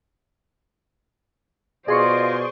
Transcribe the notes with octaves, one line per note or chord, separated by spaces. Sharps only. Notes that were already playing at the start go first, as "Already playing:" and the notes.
B2 F4 G#4 C5 D5 D#5 C6 C#6